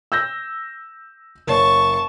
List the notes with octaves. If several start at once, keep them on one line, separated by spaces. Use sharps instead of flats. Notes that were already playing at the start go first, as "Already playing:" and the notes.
E6 G6 A#6
F#1 C#5 A5 C#6